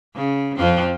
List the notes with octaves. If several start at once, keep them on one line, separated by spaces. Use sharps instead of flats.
C#3
F2 F3 C4